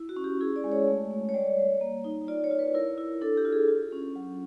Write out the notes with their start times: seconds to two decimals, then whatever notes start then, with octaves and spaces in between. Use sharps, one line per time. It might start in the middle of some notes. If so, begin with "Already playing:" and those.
Already playing: E4
0.09 F#4
0.16 C#4
0.24 G4
0.41 E4 G#4
0.56 D5
0.64 G#3
0.72 C#5
0.87 A3
1.11 A3
1.29 C#5
1.34 G3 D5
1.58 G3
1.81 A#3
2.04 D#4
2.28 F4 D5
2.44 C#5
2.51 F4
2.59 B4
2.74 E4 A#4
2.98 E4
3.21 D4 A4
3.37 G4
3.45 F4
3.52 G#4
3.68 F4
3.93 C#4
4.16 F#3